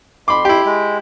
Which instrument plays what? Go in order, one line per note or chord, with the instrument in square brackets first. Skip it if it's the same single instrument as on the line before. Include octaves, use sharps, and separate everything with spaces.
[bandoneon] F2 C6 [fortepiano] B5 D6
[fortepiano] E4 G4
[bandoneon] G#3